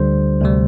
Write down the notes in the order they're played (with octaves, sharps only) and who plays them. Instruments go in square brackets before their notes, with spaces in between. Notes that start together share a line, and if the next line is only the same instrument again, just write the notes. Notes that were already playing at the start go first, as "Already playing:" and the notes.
Already playing: [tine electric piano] D2 D3 G3 C5
D2 C3 G3